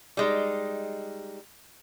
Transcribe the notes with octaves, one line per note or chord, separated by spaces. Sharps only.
G3 G#3 D#4